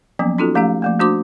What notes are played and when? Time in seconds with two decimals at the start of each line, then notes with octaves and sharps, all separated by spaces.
0.19 F3 F#3 A#3 B3 C#4
0.38 C#4 D#4 F4 F#4 A4
0.55 F3 A3 C#4 G4 F5
0.82 F3 A3 A#3
1.00 A3 D4 F#4 C5 C6 D6